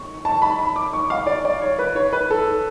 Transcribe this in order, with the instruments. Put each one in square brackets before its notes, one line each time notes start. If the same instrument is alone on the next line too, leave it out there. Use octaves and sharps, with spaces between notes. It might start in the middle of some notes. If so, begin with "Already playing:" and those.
Already playing: [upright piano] C#6
A5
B5
B5
D6
C#6
F5
D5
D5
C#5
B4
C#5
B4
A4